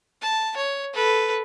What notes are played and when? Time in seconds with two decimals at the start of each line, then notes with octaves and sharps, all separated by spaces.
0.22 A5
0.56 C#5
0.93 A4 B4